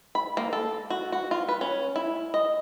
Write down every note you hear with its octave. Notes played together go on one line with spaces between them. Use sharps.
B5
A#3
A4
F#4
F#4
F4
B4
C#4
E4
D#5